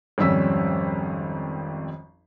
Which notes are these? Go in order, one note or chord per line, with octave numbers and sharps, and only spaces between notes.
G#1 F2 G3 C#4 E6 B6